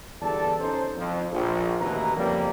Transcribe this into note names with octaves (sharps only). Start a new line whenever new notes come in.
G1 E2 G3 A4 D5 A5
C#4 D#4 A4 C5
F2
A#1
A1 D#2 B2 E3 B4 A#5
F2 C#3 G3 A#3